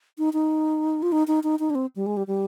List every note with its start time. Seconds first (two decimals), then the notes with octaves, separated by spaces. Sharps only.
0.18 D#4
0.33 D#4
1.03 F4
1.12 D#4
1.28 D#4
1.44 D#4
1.60 D#4
1.70 D4
1.75 C4
1.96 G3
2.06 G#3
2.17 G3
2.27 G3